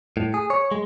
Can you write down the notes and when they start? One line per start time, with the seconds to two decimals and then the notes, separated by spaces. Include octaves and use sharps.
0.17 A2
0.34 G#4
0.50 C#5
0.71 G#3